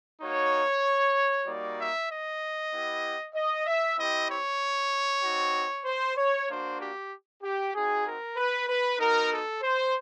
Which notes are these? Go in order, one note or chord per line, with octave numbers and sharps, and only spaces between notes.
A#3 D#4 F#4 C#5
G3 A#3 D#4 F#4 D5
E5
D#5
B3 E4 G4
D#5
E5
C4 E4 G4 D#5
C#5
C4 D#4 F#4
C5
C#5
A#3 D4 F#4 C5
G4
G4
C4 D#4 F#4 G#4
A#4
B4
B4
B3 D#4 F#4 A#4
A4
C5